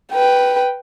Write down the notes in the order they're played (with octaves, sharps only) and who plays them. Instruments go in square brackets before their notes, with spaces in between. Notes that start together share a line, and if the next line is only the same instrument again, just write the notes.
[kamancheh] B4 G5